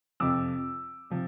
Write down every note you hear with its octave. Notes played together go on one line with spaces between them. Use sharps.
F2 C3 F3 D6 E6
C3 F3